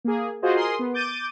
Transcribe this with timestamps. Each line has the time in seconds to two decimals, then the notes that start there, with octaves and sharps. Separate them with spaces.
0.05 A#3 G#4
0.42 F4 F#4 G#4 C5 D#5
0.57 G#4 A#4 C6 D#6
0.79 B3
0.94 D6 G6 A6 D#7